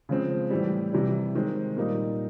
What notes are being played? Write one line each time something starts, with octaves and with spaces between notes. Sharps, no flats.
C#3 F3 G#3 C4
A2 E3 G3
C3 E3 G3
D#3 G#3 C4
A#2 G3 A#3 D#4